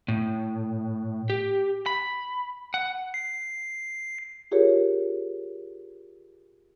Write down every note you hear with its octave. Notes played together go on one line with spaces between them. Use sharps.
A2
G4
B5
F#5
C7
F4 G4 G#4 A#4 C#5